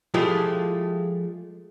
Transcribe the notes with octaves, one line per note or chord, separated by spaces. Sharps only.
F3 G#3 A3 E4 F4 G4